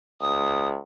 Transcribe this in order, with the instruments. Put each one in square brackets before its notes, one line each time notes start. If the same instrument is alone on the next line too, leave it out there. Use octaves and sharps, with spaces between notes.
[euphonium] C#2 [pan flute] D#6